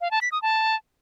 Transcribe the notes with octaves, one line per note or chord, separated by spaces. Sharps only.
F5
A5
B6
D#6
A5